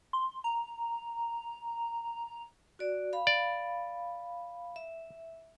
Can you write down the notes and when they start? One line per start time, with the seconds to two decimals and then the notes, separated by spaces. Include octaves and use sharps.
0.13 C6
0.44 A#5
2.79 F#4 D5
3.13 F5 B5
3.27 D5
4.76 E5